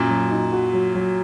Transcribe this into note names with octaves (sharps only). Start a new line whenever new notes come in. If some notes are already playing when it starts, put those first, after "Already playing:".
Already playing: F#2 A#2
F#3
D#4
F#4
F#3
F#3